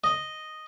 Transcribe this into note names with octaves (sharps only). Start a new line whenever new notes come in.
D#5